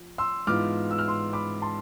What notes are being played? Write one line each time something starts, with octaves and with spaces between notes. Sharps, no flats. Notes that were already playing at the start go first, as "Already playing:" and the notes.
Already playing: F3
C6 E6
G#2 E3 B3 F4 D6 F6
E6
F6
C6 E6
B5 D6
A5 C6